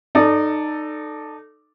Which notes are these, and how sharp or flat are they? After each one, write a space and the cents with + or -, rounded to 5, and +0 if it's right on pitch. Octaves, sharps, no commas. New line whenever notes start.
D#4 -20 A4 +0 D5 +0